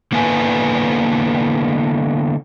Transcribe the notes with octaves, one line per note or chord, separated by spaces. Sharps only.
D3 A#3 B3 E4 B4 G#5